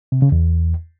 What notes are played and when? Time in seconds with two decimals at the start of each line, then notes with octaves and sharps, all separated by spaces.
0.12 C3
0.22 C#3
0.32 E2